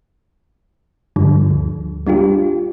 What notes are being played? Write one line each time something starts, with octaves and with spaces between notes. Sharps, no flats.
G2 D3 F3 G3
D2
G3 D4 F4 G4